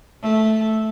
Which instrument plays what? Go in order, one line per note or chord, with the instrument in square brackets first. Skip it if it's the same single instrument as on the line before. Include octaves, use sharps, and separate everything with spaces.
[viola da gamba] A3